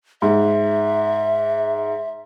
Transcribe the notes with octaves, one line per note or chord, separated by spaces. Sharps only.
G#2 E5